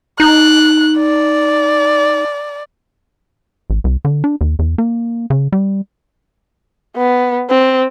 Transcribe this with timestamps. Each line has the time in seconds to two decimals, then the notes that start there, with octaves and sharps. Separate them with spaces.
0.20 D#4 F#6
0.99 D5
3.70 A1
3.84 C2
4.05 D3
4.24 D4
4.41 D#2
4.59 E2
4.78 A#3
5.30 C#3
5.52 G3
6.97 B3
7.50 C4